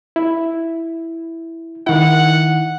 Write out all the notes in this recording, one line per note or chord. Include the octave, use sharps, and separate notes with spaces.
E4
D#3 E4 F#5